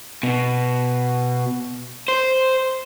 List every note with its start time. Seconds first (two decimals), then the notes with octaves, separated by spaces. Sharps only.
0.23 B2
2.08 C5